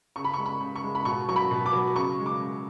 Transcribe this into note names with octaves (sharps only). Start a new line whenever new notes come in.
C#3 C#6
B5
C#6
G#3
B5
C#3
C#6
G#3
B5
B2 C#6
F#3 C#6
B5
B2
D6
F#3
C#3 C#6
G#3
D6
C#3